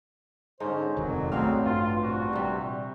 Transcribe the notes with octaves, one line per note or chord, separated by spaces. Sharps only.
G#2 D3 G#3 C#4 D#4 C5
E1 C2 F2 A#2 D#3 F#3
A1 G#2 B2 F#3 A3 C4 D4 F5
G2 F4
G2 A#2 C4 F#4
C3 G3